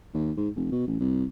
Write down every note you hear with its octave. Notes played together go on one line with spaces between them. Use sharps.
D#2
G#2
F1
B2
A1
C2